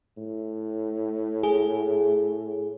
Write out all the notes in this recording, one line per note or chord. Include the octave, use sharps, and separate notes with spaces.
A2
G#4